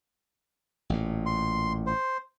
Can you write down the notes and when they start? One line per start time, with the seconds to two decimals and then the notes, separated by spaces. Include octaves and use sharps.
0.90 A1 A#2
1.26 C6
1.87 C5